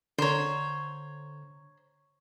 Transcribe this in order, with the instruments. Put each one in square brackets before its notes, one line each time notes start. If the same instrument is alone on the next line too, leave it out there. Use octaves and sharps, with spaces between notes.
[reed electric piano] D3 A#5 [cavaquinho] C5 C#5